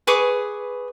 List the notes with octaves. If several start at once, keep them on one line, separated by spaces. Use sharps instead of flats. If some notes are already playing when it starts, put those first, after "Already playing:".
G#4 B4 C#6 D6